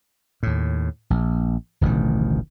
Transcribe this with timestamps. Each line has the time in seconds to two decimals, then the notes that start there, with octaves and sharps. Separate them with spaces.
0.43 D#2 A2
1.10 A#1
1.81 D1 A1 B2 D#3